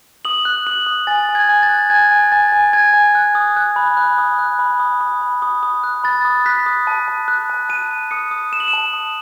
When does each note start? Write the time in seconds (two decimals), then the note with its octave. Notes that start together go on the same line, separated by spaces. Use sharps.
0.25 D#6 F#7
0.45 F#6
0.67 D#6 F#7
0.86 D#6
1.07 G#5 A6
1.29 G#5
1.35 G#6
1.49 G#5
1.63 A6
1.69 F#6
1.90 G#5 G#6
2.11 G#5
2.32 G#5 A6
2.52 G#5
2.73 G#5 G#6
2.93 G#5
3.15 F#6
3.35 D#6
3.57 F#6
3.76 B5
3.97 F#6
4.18 D#6
4.39 F#6
4.59 B5
4.79 D#6
5.01 D#6
5.22 B5
5.42 D#6
5.63 D#6
5.84 F#6
6.04 B5 A6
6.25 D#6
6.46 F#6 B6
6.66 D#6
6.87 A5
7.08 A5
7.28 F#6
7.50 A5
7.69 A5 D#7
7.90 A5
8.11 D#6 C#7
8.31 D#6
8.52 D#6 E7
8.60 F#7
8.68 E7
8.73 A5
8.93 D#6